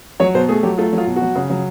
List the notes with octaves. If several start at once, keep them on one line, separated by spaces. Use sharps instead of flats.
F#3 C#5
B2 C5
A3 G#4
F#3 G4
A3 F4
F#3
F4
B2
F#4
F#3
C#3
F#3